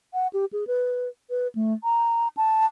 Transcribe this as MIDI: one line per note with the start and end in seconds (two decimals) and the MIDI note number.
0.14 0.27 78
0.33 0.45 67
0.53 0.67 68
0.67 1.09 71
1.30 1.48 71
1.55 1.74 57
1.84 2.28 82
2.37 2.66 81